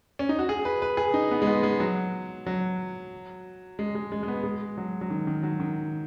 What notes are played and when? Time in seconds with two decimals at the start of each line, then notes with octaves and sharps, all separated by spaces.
0.19 C#4
0.29 D#4
0.39 F#4
0.49 G#4
0.65 B4
0.82 B4
0.97 G#4
1.14 D#4
1.31 B3
1.42 G#3
1.47 B3
1.63 G#3
1.80 F#3
2.46 F#3
3.79 G#3
3.95 G#3
4.12 G#3
4.23 G#3
4.28 B3
4.44 G#3
4.77 F#3
5.01 F#3
5.10 D#3
5.27 D#3
5.43 F#3
5.60 D#3